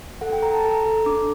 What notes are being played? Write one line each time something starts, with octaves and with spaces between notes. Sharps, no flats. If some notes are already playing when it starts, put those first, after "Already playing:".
A4 F#5
G5
A4 A#5
A5
A4 A#5
A4
D4 D6